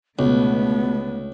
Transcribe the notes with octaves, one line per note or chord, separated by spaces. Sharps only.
C#2 B2 D3 A3 B3